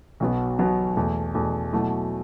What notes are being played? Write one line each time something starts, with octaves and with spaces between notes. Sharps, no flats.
B1 B2 F#3 B3
B1 B2 F#3 B3
E2 B2 A3
E2 B2 A3
B2 F#3 A3 E4